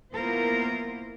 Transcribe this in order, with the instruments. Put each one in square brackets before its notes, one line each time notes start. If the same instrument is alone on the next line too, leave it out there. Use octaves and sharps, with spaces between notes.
[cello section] A#3 B3 E4 F4 A#4 C5